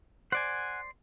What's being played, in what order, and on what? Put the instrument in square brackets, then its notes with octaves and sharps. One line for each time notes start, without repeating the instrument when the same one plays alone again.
[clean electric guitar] C5 D5 [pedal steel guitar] F#5 G#5